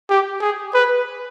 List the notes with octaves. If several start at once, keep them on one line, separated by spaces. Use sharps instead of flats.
G4
G#4
B4